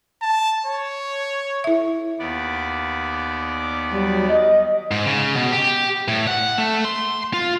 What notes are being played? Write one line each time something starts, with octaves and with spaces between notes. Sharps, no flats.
A5
C#5
E4 E5
D#2 B3 D5
F#3 G3
D#5
G#2
C#3
B2
G4
A2
F#5
A3
C6
F4